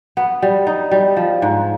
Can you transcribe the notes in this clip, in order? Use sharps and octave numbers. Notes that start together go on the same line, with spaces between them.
B3
G3
D#4
G3
F3
G#2